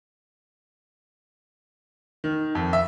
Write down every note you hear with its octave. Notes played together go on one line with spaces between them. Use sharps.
D#3
F2
E5